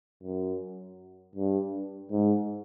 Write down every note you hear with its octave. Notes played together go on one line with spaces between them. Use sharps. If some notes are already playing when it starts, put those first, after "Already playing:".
F#2
G2
G#2